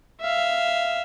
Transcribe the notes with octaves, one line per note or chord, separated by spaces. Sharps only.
E5 F5